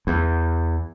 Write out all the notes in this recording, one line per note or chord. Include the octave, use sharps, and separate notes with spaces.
E2